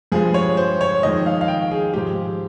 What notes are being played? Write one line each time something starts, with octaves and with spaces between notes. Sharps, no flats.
G2 F3 G#3 G#4
C#5
C5
C#5
F2 D#3 G#3 D#5
F5
F5
G5
G#4
G#2 F3 G#3 G4